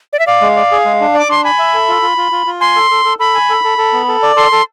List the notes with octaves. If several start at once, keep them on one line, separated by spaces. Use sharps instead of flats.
D5
E5
D5 F5
G#3
D5
G#4
G#3
D4
D5 D6
D4 C6
G#5 B5
E5
A4
F4
F4
F4
F4
F4
G#5 C6
A4
A4
A4
A4 B5
G#5
A4
A4
A4
B3
A4
D5
A4 C6
A4